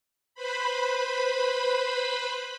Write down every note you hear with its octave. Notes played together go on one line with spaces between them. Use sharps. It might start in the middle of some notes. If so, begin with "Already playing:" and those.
B4 C5 B5